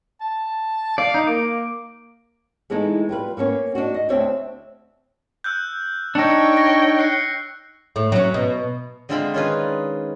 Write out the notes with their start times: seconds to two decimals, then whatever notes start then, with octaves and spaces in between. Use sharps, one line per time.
0.21 A5
0.98 D5 F5
1.14 D#4
1.27 A#3 D6
2.70 E3 G#3 A3 B3 D#4 E4
3.09 G3 F4 B4
3.37 A#3 B3 C#4 C#5
3.75 D4 D#4 F#4
3.94 D#5
4.09 D2 C4 D4 C#5 D5 E5
5.44 E6 F#6 G6
6.15 D4 D#4 C#5 G5 E6 C#7
6.57 A#6
6.99 F#6 C7 C#7
7.96 A2
8.12 F#3 C#4
8.34 B2
9.09 D3 G#3 C4 F4 E5 B5
9.34 D#3 C#4 D#4 F4 G#4 B4